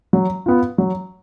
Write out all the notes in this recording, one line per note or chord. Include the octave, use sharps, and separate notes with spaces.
F#3
B3 F4
F#3